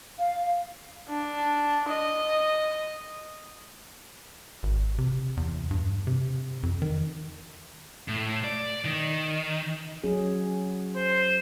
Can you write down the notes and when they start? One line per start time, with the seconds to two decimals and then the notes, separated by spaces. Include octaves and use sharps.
0.19 F5
1.09 D4
1.89 D#5
4.63 G#1
4.98 C3
5.37 E2
5.71 G2
6.07 C3
6.63 F2
6.82 D#3
8.08 A2
8.44 D5
8.85 D#3
10.04 F#3 C#4 G#4
10.96 C5